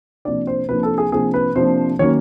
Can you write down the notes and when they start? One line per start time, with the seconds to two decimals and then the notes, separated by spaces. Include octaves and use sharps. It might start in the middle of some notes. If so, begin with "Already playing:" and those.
0.25 C3 F3 A#3 D4 D5
0.47 C5
0.69 C3 F3 A#3 D4 B4
0.83 A4
0.98 G#4
1.12 C3 F3 A#3 D4 G#4
1.34 B4
1.56 C3 F3 A#3 D4 C5
1.99 D#3 F#3 A#3 C#4 C#5